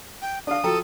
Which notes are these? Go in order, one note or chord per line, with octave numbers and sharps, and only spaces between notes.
G5
D4 F5 D#6
F3 F#4 A4 G5 A#5